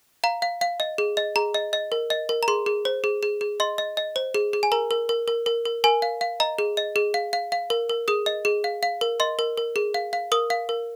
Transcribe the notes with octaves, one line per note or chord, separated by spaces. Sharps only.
F5 A#5
F5
F5
D#5
G#4
D#5
G#4 A#5
D#5
D#5
A#4
D#5
A#4
A#5
G#4 C6
G#4
C5
G#4
G#4
G#4
D#5 C6
D#5
D#5
C5
G#4
G#4
G#5
A#4 A#5
A#4
A#4
A#4
A#4
A#4
A#4 G#5
F5
F5
D#5 A#5
G#4
D#5
G#4
F5
F5
F5
A#4
A#4
G#4 D#6
D#5
G#4
F5
F5
A#4
D#5 C6
A#4
A#4
G#4
F5
F5
A#4 D#6
F5
A#4